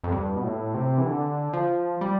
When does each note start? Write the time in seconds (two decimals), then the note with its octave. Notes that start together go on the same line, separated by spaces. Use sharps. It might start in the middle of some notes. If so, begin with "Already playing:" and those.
0.03 F2
0.12 G2
0.36 B2
0.44 A2
0.74 C3
0.98 E3
1.06 D3
1.53 F3
2.01 G3